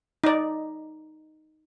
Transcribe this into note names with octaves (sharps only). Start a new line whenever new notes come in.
D#4 D5